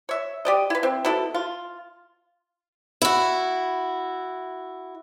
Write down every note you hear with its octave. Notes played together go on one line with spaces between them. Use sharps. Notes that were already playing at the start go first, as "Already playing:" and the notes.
C#5 E5
G4 D5 D#5
E4 B4
C4
B2 E4 A4
F4
E4 F#4